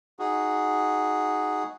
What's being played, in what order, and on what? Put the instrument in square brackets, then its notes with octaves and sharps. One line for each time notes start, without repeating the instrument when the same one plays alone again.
[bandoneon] D#4 F#4 G#4